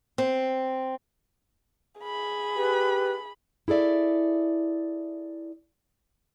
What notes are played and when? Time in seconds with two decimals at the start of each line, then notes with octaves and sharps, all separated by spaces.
0.18 C4
2.01 G#4 B5
2.56 G4 B4
3.68 E4 G#4 A4 D5 E5